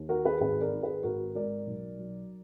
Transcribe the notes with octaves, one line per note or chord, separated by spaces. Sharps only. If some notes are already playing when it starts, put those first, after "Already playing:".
Already playing: D#2
D#3 F#4 A#4
G#4 B4
G#1 G#4 B4
A#4 D5
D#3
G#4 B4
G#1 F#4 A#4
G#2 A#4 D5
B1
F#3